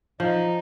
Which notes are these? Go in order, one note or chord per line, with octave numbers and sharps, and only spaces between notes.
F3 D#4